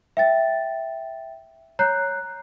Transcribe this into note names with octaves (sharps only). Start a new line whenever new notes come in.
E5 G5 A6
C#5 A#5 F#6 G6 C7